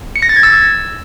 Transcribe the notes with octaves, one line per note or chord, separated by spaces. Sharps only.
C#7
A#6
A6
G#6
E6